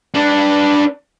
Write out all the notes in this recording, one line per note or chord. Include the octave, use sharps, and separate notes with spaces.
D4 B4